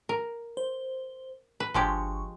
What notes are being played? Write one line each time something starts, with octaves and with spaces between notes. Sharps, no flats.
A#4
C5
B4
G1 F3 G#3 G4 C#6